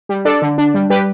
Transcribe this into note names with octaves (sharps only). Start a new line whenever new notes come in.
G3
D4 A4 D5
D3
D4
G3
G3 G4 B4